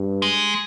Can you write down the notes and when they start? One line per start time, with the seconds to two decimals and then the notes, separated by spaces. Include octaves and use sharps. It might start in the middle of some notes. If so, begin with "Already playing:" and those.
Already playing: G2
0.22 G#3